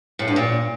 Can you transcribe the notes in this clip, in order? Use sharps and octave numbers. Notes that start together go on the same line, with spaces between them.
A2
G2
A#2